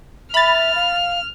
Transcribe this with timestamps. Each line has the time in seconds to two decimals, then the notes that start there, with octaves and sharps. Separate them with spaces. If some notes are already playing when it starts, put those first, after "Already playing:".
0.34 E5 B5 F6 A6
0.76 F5